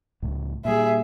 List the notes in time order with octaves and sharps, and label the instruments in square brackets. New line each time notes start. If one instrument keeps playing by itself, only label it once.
[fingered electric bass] C#2 A2
[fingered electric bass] A#2 G3 [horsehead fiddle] G#4 E5